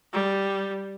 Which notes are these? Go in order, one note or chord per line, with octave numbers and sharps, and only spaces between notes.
G3